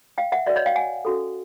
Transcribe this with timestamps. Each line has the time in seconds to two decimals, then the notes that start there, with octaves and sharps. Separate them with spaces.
0.18 F5 G5
0.32 E5 F#5
0.46 F#4 B4 D5 E5
0.56 C#5 D#5
0.66 F5 G5
0.76 F#5 G#5
1.05 C#4 F#4 A4